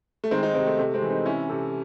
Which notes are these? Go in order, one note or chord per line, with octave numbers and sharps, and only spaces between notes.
A3
D#3 G#3 C4
C4 D#4
C3 G#3 C4
A3
C3 A3
G#3 C4
E3
C4 D#4
C3 C#4 E4
C3 A4